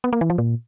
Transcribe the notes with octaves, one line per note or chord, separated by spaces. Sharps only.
B3
A#3
E3
F3
A#2